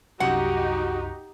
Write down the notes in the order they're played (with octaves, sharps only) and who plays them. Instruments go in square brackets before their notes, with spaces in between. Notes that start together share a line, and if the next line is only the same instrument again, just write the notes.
[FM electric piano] C2 F#2 [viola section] D#4 G4 [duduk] F#4 [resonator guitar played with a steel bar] F#5